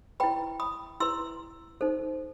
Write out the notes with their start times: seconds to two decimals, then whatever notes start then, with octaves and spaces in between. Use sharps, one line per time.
0.20 E4 B4 G5 B5
0.60 B5 D#6
1.00 E4 B4 C6 E6
1.81 D#4 A4 C5